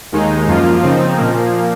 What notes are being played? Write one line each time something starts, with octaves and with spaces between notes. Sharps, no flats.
D#2 D#3 G#3 D#4
F#2 F3 A#3 F4
C#3 F3 C4 D#4
A#2 F3 A#3